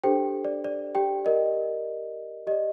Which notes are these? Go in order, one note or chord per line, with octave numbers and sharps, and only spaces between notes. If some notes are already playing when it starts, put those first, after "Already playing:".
D4 G4 A4 C5 G5
D5
D5
G4 G5
G4 A#4 D5 D#5
G4 D5 D#5